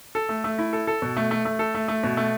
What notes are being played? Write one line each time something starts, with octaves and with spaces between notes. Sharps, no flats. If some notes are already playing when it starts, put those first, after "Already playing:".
A4
A3
A3
E4
A4
A4
B2
A3
A3
A3
A4
A3
A3
B2
A3